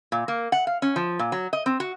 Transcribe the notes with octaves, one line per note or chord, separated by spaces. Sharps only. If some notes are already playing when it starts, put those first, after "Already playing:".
A#2
A#3
F#5
F5
C#4
F3
A#2
F#3
D#5
C4
F#4